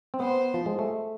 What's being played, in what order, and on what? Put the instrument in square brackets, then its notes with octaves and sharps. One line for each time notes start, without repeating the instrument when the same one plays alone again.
[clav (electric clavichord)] C4
[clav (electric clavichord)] B3 [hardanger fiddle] C5
[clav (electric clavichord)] F3
G#3
A3